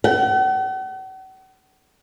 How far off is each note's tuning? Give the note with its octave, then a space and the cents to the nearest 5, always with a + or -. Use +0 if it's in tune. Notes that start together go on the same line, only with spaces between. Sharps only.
F#5 +45